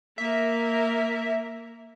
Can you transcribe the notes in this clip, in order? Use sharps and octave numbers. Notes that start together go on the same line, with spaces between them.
A#3 A#4 E5